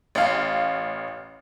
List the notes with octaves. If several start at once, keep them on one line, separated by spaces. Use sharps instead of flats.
A1 F5